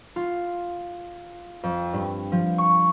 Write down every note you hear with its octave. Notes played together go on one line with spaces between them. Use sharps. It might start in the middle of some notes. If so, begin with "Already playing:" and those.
F4
F2
G2
F3
C#6